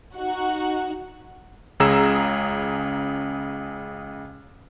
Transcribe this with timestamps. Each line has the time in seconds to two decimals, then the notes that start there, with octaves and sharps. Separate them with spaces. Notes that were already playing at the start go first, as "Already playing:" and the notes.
0.16 D#4 F#4
1.80 C#2 C#3 G#4 A#5 E6 E7